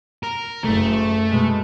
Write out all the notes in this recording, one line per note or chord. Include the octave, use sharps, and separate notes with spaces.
A#4
F#1 A3
B2 G#3